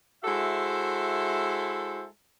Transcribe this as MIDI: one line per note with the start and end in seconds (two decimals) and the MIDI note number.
0.25 2.06 56
0.25 2.06 64
0.25 2.06 66
0.25 2.06 69
0.25 2.06 72
0.25 2.06 76